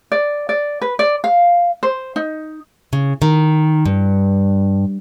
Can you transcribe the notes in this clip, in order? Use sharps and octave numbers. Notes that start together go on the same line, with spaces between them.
D5
D5
B4
D5
F5
C5
D#4
C#3
D#3
G2